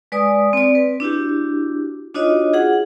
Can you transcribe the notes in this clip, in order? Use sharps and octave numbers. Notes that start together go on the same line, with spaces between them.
G#3 B4 D5 G#5 D#6
C4 D5
B4
D4 E4 F#4 G4
D4 D#4 F4 F#4 C#5 D#5
F4 G#4 F#5